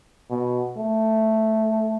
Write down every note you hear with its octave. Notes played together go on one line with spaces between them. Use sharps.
B2
A3